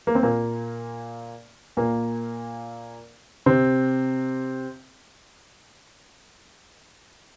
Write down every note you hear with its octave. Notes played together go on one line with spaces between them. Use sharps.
A#3
C4
A#2 A#3
A#2 A#3
C3 C4